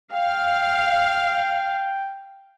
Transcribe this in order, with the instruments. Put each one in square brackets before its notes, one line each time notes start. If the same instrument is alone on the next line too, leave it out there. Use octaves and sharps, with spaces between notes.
[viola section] F5 [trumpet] G5